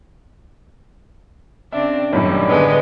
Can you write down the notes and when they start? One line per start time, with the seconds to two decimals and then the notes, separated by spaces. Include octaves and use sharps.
1.72 C#3 C4 D4 E5
2.13 B1 F#2 A2 D#3 G3
2.48 D3 G#3 B3